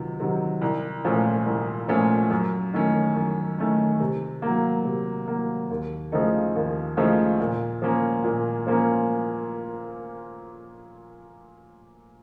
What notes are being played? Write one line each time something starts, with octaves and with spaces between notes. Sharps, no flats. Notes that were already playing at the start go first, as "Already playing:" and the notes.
Already playing: C#2 C3 D#3 F#3
C3 D#3 F#3
C2
A#2 F3 A3 C#4
C2
A#2 F3 A3 C#4
F#2
D#3 A3 C#4
F#2
D#3 A3 C#4
C3
F#3 A#3
C3
F#3 A#3
D#2
C#3 F3 A3 D#4
D#2
C#3 F3 A3 D#4
A#2
F3 A#3 C#4
A#2
F3 A#3 C#4